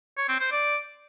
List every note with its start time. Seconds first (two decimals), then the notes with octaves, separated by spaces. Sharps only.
0.17 C#5
0.29 C4
0.40 C5
0.52 D5